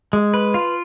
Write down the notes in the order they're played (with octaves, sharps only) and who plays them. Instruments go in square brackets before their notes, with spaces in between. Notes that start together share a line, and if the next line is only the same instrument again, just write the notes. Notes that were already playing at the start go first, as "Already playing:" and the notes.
[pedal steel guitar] G#3
B4
F4